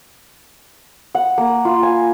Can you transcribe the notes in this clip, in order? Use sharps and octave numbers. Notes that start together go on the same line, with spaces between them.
F#5
A#3
F4
G#5